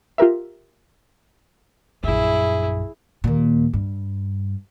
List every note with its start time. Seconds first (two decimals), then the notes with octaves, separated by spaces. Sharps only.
0.18 F4 G4 A#4 E5
2.04 A#1 F#2 E4 G#4
3.24 D#2 A#2
3.73 G2